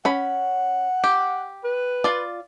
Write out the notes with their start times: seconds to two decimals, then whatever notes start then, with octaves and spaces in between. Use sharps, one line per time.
0.05 C#4 F#5 B5
1.04 G4
1.64 B4
2.04 F4 D5